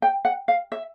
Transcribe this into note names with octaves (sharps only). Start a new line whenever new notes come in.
G5
F#5
F5
E5